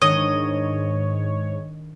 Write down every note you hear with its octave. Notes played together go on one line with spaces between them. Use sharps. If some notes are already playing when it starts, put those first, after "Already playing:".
G#2 D#3 D4 C#5 D#5